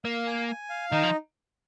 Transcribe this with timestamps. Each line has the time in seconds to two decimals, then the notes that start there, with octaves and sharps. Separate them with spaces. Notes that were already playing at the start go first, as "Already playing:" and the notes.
0.05 A#3 F5
0.27 G#5
0.48 G#5
0.70 F5
0.91 D#3 D#4
1.03 F3